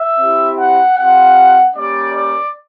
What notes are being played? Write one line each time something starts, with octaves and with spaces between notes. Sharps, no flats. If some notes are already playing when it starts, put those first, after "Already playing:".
Already playing: E5
C4 E4 G4
F#5
G3 C4 F4 F#5
G3 A#3 C#4 D5
D5